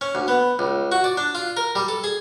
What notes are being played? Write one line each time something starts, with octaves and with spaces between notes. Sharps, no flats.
C#4
D2
B3
C#2
F#4
D5
D4
F4
A#4
G3
A4
G#4